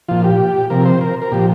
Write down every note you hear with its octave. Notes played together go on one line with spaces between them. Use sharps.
A#2 F3 F4
G4
C3 F3 A#4
C5
A#4
A#4
A#2 F3 G4